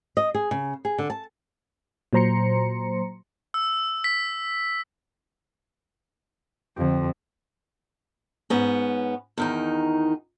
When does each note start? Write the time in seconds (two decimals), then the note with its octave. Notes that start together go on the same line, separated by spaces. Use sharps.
0.17 D#5
0.34 G#4
0.51 C#3
0.85 G#4
0.98 D3
1.10 A5
2.13 A#2 F#3 C5 A#5 C6 C#7
3.54 E6
4.04 B6
6.76 F2 D3 G4
8.50 G#2 B3 C#4
9.38 E2 D#3 D#4